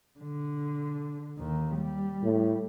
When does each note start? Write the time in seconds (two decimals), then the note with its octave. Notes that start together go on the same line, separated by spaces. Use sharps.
0.20 D3
1.38 D#2 D#3
1.77 G3
2.23 A2